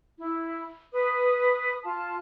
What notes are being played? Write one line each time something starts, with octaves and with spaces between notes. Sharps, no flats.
E4
B4 D#6
F4 A5